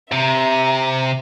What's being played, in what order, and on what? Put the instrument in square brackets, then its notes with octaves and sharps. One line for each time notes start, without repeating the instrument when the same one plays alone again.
[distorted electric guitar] C3 [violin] E5 A#5